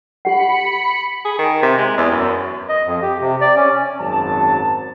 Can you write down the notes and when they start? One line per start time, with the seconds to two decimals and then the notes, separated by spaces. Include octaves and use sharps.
0.25 G4 F#5 B5 C#7
1.25 G#4
1.38 D#3
1.62 C3
1.77 G#3
1.97 E2
2.11 F#2
2.69 D#5
2.86 F2
3.02 G4
3.21 C3
3.41 D5
3.56 C#4
4.00 G#1 F#2 F#3 A5